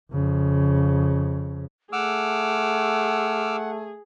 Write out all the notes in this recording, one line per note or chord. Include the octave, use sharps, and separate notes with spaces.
F2 C#3
A3 G#4 F#5 D6 E6 F6